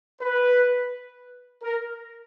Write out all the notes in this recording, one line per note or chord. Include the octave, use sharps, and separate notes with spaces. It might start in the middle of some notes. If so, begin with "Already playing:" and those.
B4
A#4